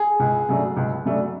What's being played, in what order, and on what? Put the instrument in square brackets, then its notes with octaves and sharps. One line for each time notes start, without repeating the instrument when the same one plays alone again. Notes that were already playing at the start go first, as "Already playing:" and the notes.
Already playing: [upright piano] G#4
C#2
C#3 F#3 A3 D4
C#2
C#3 F#3 A3 D4